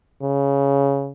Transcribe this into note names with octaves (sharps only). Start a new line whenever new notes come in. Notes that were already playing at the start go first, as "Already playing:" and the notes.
C#3